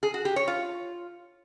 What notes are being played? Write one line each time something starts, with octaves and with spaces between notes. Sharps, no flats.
G#4
F#4
G4
C#5
F4